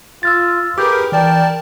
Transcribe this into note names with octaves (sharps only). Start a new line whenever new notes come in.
F4 E6 F6 A6
G4 G#4 A#4 B4 D6 G6
E3 A#4 D5 G5 A5